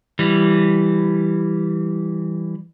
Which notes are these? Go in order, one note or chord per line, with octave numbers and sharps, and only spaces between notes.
E3 G3